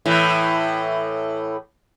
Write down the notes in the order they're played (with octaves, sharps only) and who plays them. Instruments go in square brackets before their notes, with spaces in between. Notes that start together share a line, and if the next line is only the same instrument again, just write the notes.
[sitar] A2 E3